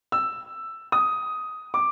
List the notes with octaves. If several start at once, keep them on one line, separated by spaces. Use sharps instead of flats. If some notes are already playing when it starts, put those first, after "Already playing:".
E6
D#6
D6